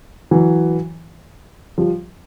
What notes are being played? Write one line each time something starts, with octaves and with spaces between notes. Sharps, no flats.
E3 F#3
F3 G3